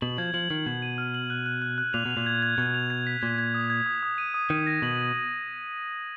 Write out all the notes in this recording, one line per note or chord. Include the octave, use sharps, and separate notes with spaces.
B2 F#7
F3 G#6
F3 F#7
D#3 F#7
B2 G#6
D#7
F6
F#7
F#6
F#6
F#6
F#6
A#2 F7
B2
F7
A#2
G#6
G#6
B2 G#6
F7
G#6
B6
A#2 G#6
G#6
D#6
G#6
D#6
D#6
D#7
D#6
D#3 D#7
A#6
B2 F#7